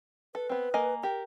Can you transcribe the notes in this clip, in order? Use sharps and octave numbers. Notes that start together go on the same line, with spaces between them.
A4 B4
B3 C4
A#3 D#5 G#5
G4 A#4 G5